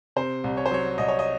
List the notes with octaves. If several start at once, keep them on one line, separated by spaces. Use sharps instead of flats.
C3 C5
C2
C#5
C5
F#3 C#5
C2 D#5
C#5
D#5